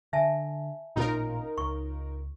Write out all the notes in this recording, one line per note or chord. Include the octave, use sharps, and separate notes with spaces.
D3 E5 G#5 A5
A1 A#2 C#4 D#4 F4 A#4
C#2 C#6